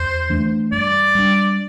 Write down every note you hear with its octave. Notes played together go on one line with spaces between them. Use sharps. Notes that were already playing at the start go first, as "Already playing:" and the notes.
Already playing: E2 C5
E3 A3 D4
G2 D5
G3 D4